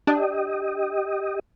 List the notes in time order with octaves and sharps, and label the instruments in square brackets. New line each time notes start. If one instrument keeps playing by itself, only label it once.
[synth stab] D4 [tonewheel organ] G4 D#5